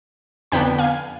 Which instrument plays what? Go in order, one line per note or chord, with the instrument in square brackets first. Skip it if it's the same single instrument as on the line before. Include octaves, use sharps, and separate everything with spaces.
[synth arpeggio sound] F2 D3 F3 B3 D4 G5 B5
F5 G#5